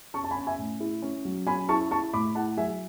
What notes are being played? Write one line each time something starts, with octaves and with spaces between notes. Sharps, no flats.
C#4 A5 C#6
A5
G#5 B5
C#4
E5 G#5
A2
E4
C#4
F#3
C#4 G#5 B5
E4 A5 C#6
E4 A5 C#6
A2 B5 D6
E4 F#5 A5
F#3 E5 G#5